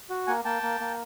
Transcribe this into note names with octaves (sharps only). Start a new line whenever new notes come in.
F#4
A#3 F#5 G#5
A#3 G5 A5
A#3
A#3